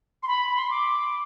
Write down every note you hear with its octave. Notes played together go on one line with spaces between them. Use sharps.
C6
B5
C6
D6